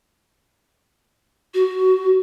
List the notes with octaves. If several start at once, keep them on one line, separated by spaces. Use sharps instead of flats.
F#4